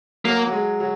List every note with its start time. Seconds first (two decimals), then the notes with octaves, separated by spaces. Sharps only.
0.25 F#3 A#3
0.47 F#3
0.52 G#3
0.80 F#3